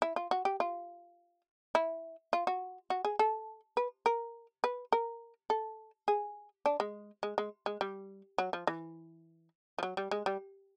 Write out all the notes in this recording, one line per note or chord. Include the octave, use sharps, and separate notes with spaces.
E4
F4
F#4
G4
F4
E4
F4
F#4
F#4
G#4
A4
B4
A#4
B4
A#4
A4
G#4
D4
G#3
G#3
G#3
G#3
G3
F#3
F3
E3
F3
F#3
G3
G#3
G3